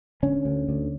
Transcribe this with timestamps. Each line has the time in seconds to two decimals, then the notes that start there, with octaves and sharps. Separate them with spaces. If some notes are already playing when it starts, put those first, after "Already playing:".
0.23 D3 C#4
0.45 D2
0.69 D2